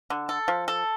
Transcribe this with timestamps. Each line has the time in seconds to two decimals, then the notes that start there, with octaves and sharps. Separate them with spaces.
0.10 D3
0.29 A4
0.48 F3
0.68 A4